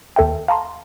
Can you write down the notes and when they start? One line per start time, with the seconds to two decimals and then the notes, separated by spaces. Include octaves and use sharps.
0.16 D#2 A4 E5 G5
0.48 F5 A5 A#5 C6